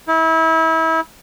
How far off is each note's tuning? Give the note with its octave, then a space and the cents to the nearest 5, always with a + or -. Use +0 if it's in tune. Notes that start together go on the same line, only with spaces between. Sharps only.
E4 -30